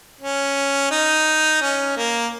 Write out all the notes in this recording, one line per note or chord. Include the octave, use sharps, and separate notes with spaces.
C#4
D#4
C#4
A#3